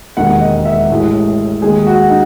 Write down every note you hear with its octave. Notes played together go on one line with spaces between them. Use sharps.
E1 D#2 D#3 G#3 F#5
D#5
E5
A1 A2 G#3
D#2 D#3 G#3 G#4
F#4
D#4